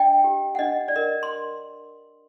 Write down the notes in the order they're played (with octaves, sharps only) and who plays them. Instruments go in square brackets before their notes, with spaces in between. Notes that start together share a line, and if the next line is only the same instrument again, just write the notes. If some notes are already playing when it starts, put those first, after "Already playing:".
Already playing: [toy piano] D4 D#5 G5
G4
F#5
D4 D#5
D5
A#4 D#5
C6